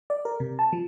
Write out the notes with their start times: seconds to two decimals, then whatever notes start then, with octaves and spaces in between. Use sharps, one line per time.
0.10 D5
0.25 A#4
0.40 C3
0.59 A5
0.73 F3